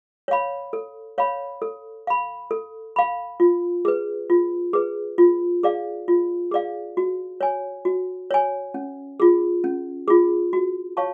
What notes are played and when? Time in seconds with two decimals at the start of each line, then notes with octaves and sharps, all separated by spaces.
0.28 C#5 F5 B5
0.73 A4
1.18 C#5 F5 B5
1.62 A4
2.07 F5 B5
2.51 A4
2.96 F5 B5
3.40 F4
3.85 G#4 B4
4.30 F4
4.73 G#4 B4
5.18 F4
5.63 G#4 D5 F5
6.08 F4
6.51 G#4 D5 F5
6.97 F#4
7.41 C#5 G#5
7.85 F#4
8.31 C#5 G#5
8.74 C#4
9.20 F4 G#4
9.64 C#4
10.08 F4 G#4
10.53 F#4
10.97 C#5 F5 A5 C#6